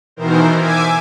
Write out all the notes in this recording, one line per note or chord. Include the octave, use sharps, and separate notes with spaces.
B2 D#3 E3 A#4 C5
E5 G#5 D6 G#6